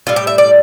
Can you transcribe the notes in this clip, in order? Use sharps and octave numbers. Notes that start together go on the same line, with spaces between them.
A2 G3 F4
G4
E5
D5